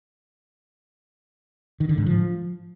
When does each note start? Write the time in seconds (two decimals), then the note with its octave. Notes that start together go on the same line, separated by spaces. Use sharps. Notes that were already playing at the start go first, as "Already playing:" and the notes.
1.80 D#3
1.89 D3
1.98 G#2
2.06 F3